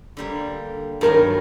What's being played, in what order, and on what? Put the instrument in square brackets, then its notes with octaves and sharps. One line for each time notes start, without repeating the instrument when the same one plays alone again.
[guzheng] D3 G3 A#3
[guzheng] G2 D#3 F#3 B3 [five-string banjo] A#4